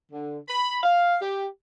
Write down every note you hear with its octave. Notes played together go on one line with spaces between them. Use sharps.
D3
B5
F5
G4